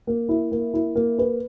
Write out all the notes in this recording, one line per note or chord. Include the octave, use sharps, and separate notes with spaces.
A#3
E4
A#3
E4
A#3
B4